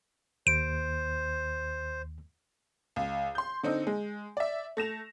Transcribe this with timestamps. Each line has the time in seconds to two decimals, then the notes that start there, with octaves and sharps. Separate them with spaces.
0.47 D#2 C5 D7
2.96 C#2
3.35 C6 G6
3.63 D3 C4 D#4
3.87 G#3
4.37 D5 E5
4.77 A3 A#6 E7 F7